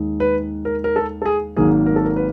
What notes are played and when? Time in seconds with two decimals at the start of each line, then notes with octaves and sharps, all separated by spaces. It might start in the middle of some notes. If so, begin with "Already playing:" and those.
Already playing: D#2 D#3 G#3
0.20 B4
0.65 A#4
0.84 A#4
0.96 A4
1.22 A4
1.25 G#4
1.56 G#1 G#2 D#3 F#3 A#3 G#4
1.86 A#4
1.96 A4
2.05 A#4
2.16 B4